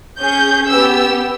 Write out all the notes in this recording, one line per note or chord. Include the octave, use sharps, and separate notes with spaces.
C#4 G#4 G6
B3 G4 E6